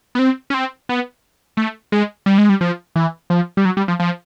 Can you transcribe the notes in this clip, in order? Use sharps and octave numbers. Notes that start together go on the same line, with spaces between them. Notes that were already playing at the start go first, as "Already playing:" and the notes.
B3
C4
C#4
C4
B3
A3
G#3
G3
G#3
G3
F3
E3
F3
G3
F#3
G3
F3
F3